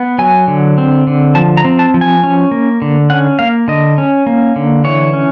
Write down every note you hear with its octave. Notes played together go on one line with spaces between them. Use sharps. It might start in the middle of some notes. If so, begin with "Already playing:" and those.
Already playing: B3
F#3 G#5
D3
C4
D3
F3 A5
A#5
C4
A5
F3
G#5
C#4
A#3
D3
C#4 F#5
A#3 F5
D3 D#5
C#4
A#3
D3
E3 C#5
C#4